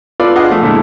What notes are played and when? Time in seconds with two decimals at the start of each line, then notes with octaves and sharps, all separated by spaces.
0.20 F4 A4 B4 D5
0.36 D4 F4 G#4 D#5 F#5
0.50 F3 A3
0.62 A#2 D3 G#3 A3 E4